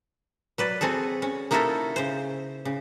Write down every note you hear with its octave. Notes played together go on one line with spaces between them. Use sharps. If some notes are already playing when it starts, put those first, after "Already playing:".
F#3 B4 D5
C4 F#4 G#4 A4
C#4
A#3 D#4 E4 F#4 A4 A#4
C#3 C5
C#3